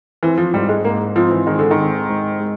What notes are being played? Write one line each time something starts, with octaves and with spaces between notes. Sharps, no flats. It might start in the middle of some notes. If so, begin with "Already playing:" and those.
E3 C4
F3
G#2 G3
G#3
G#2 A#3
F3 C4
E3
D#3 G#3
D3
D#3
C4
G#2
G#3